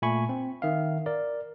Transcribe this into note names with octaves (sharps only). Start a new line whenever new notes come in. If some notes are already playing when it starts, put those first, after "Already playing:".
A#2 A3 G#5 B5 C#6
C4
D#3 E5 F5
A#4 D5